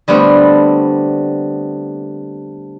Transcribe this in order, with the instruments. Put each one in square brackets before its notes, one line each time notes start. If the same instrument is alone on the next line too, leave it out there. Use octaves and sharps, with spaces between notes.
[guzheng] D3 G3 A3 B3 C4